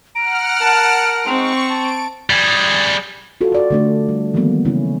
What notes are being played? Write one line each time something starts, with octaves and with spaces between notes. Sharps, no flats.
F#5 A#5 F6 D7
A#4 A5
G#3 C4 D#4 C#6
A5 D7
G3 G#4
F4 F#4 A4
F#4 D5
D3 A3 D4
G3
D#3 E3 F#3 G3 A#3 B3
C#3 C#4 E4